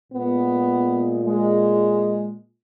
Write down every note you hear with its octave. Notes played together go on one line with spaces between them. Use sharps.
A#2 G#3 B3
G#3